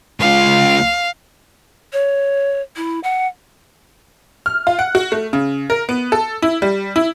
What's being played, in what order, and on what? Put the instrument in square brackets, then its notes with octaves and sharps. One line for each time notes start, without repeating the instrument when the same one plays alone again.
[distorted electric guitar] C#2 F4 [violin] F5
[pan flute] C#5
E4
F#5
[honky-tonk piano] F6
F4
F#5
F#4
A3
C#3
A#4
B3
A4
E4
G3
E4